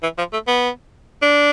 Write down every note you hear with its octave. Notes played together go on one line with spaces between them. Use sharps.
E3
F3
A3
B3
D4